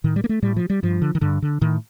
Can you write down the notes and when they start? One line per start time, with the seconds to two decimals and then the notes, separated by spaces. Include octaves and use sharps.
0.04 A2 D#3
0.16 G3
0.24 A#3
0.29 A3
0.42 A2 G3
0.56 F3
0.70 G3
0.83 G2 F3
1.02 D3
1.15 D#3
1.21 G2 D3
1.42 D3
1.61 A2 D#3